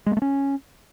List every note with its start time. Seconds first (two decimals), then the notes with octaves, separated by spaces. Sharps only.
0.06 G#3
0.12 A#3
0.17 A3
0.22 C#4